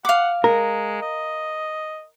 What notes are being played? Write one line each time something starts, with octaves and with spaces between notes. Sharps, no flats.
F5 F#5 D6
G#3 A#4
D#5